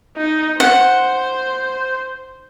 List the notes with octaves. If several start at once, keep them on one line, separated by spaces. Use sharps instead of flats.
D#4
C5 F#5